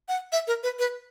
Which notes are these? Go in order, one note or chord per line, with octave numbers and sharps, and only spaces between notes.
F#5
E5
A#4
B4
B4